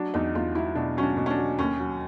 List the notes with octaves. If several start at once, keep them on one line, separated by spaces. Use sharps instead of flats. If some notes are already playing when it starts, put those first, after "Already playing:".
Already playing: F#3 D4
E2 D#4
E2 F4
F#3 E4
B2 D4
F#3 C#4
D4
B2
C#4
D4
F#3
D#2 C#4
F#3